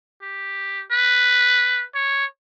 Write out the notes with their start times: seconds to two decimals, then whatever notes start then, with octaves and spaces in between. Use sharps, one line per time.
0.22 G4
0.91 B4
1.95 C#5